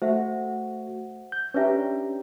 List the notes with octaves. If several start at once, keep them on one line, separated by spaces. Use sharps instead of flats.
A3 F#4 C5 E5 F#5
G6
C#4 D4 G4 B4 E5 A#5